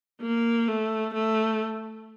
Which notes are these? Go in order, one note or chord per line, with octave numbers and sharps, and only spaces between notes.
A#3
A3
A3